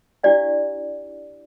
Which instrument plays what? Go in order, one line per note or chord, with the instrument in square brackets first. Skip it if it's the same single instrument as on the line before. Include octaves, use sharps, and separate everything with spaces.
[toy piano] D4 E4 G4 D5 F5